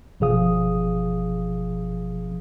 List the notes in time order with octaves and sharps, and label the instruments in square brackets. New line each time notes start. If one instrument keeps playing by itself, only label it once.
[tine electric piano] G1 B2 F3 G#4 F5 D#6